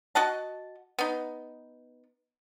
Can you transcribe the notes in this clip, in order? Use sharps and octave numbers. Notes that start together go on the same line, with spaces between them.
F#4 D#5 F#5 A5
B3 D#4